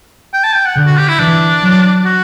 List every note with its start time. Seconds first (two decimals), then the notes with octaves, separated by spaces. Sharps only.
0.34 G5
0.44 A5
0.55 G5
0.66 F#5
0.76 D3
0.86 F#4
0.97 G4
1.08 E4
1.19 E3 D4
1.63 F#3
2.05 F#4